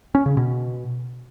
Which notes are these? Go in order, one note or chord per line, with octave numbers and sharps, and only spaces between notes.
C#4
C#3
B2